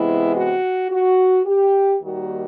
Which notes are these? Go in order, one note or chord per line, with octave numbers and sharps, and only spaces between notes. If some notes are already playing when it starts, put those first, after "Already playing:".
Already playing: C3 E3 G#3 B3 E4
F#4
F#4
G4
D#2 D#3 G3 A#3 F#4